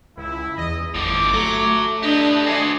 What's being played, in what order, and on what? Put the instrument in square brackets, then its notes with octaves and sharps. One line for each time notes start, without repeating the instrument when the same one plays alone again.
[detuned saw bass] C#2 [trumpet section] E4
[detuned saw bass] E2 [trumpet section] D#5
[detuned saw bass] G1 [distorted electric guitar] A2 F3 [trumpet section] D6
[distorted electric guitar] F#3 [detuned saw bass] A3
[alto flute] D4 [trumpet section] E4 D#5 [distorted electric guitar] G4 B4
[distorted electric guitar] F#4 C5 [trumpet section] D5 D#5 G#5